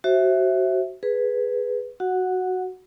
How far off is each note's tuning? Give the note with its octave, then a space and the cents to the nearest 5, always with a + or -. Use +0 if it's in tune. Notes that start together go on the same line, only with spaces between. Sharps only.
F#4 +20 C5 +30 E5 +0
G#4 +0 B4 +0
F#4 +0 F#5 -10